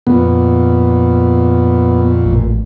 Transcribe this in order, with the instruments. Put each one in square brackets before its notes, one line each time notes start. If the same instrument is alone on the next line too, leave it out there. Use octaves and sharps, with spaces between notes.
[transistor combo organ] F2 A#2 [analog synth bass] B3
[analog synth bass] A1